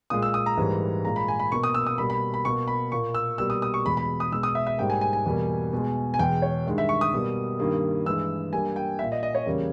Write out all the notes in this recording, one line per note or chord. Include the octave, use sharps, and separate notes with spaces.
A#2 G#3 D#6
E6
D#6
A#5
G#2 E3 G3 A#3
A#2 G#3 A#5
B5
G#5
B5
B2 A#3 C#6
D#6
E6
D#6
B2 G3 A#3 B5
B5
B5
B2 A#3 C#6
B5
A#2 A#3 C#6
E6
B2 G3 A#3 E6
D#6
D#6
C#6
E2 B2 G#3 B5
B5
D#6
B2 G#3 E6
D#6
E5
E5
G#2 G3 A#3 G5
G#5
G#5
G#5
E2 B2 G3 A#3
B2 G#3
G#5
E2 B2 G#3 G5
C#5
G2 D#3 G#3
E5
C#6
D#6
B2 G3 A#3
G2 D#3 G3 A#3
G2 E3 G#3 E6
G2 G3 A#3 G#5
G5
A#2 A#3 E5
D#5
D#5
C#5
E2 C#3 G3 A#3